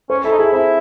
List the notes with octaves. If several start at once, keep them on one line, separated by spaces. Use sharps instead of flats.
C#4 C5
E4 A4
D#4
E4 G#4
C4 E4